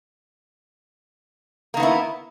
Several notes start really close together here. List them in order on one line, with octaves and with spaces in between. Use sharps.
A#3 D#3 B3 E4